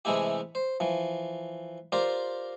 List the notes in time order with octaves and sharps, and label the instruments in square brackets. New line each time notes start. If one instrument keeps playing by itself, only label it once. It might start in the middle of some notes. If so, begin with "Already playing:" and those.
[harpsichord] C3 E3 G#3 A3 E4 G4
C5
E3 F3
F4 G4 A#4 C5 D5